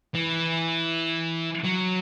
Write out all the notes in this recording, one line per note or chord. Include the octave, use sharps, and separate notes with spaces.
E3
F#3